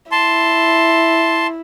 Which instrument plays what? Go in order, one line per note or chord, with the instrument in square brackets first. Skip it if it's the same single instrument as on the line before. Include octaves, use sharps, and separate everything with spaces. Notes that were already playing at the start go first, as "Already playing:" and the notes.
[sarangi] E4 [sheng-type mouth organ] A5 C6